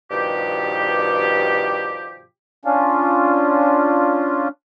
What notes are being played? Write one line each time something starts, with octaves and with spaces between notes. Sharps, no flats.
G2 B2 D#3 F3 G4
C#4 D4 F4